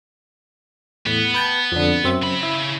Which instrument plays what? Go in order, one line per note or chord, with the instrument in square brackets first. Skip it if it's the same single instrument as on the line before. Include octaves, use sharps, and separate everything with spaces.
[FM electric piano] E2 A2 [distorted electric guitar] B3
[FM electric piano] B4 G5 A5
F2 D3
F#2 C4 E5
[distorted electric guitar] C#3 B5
[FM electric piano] E4